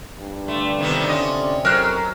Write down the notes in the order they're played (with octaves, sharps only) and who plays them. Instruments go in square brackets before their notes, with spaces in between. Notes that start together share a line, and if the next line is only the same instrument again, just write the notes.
[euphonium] G2
[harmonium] D3 F4 D5 [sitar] A3
[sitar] C3 D#3 B3
[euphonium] C3 [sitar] C#4 D#5
[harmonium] F2 C4 [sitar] F#3 [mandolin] A#4 F6 F#6